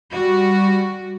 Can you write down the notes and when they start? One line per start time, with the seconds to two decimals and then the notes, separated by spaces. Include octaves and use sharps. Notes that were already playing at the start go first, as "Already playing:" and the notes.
0.12 G3 F#4